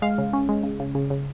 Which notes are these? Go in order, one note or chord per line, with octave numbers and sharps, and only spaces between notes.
G#3 F5
C#3
C#4
G#3
C#3
C#3
C#3
C#3